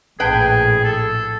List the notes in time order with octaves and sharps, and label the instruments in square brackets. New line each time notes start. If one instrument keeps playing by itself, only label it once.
[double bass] A#1 A2 [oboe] G#4 [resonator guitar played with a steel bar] B4 G5
[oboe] A4